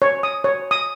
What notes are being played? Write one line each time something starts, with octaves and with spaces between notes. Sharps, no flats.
C#5
D#6
C#5
D#6